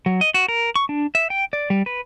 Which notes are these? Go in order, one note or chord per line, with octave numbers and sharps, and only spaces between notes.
F#3
D#5
F#4
A#4
C#6
D4
E5
G5
D5
G3
B4